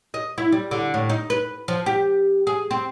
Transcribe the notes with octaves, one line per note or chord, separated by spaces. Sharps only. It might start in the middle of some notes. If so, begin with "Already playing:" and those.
D#5
E4
G3
D3
A2
D#4
B4
F3
G4
G#4
C4